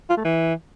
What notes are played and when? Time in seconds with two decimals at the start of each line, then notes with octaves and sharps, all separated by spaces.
0.10 F4
0.17 A3
0.24 E3